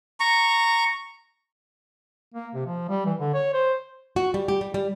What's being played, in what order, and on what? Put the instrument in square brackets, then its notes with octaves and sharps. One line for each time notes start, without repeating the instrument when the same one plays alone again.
[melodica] A#5 C#6
[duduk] A#3
C3
F3
G3
E3
D3
C#5
C5
[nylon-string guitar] F#4
G3
G4
G3
G3